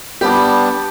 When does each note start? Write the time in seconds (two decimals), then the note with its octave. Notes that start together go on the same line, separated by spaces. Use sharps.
0.21 G3 B3 D4 G4